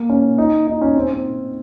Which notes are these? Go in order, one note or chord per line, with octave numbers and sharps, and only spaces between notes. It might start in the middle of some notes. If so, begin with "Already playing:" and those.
Already playing: A#3
C#4
D#4
D#4
C#4
C4
C4